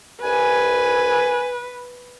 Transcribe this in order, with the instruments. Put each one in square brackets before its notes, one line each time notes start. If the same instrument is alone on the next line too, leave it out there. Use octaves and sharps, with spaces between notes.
[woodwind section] C2 G#5 [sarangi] B4